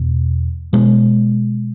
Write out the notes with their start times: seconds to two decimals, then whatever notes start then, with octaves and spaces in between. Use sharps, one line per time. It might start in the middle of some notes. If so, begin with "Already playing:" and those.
Already playing: E2 B2
0.73 B2 G#3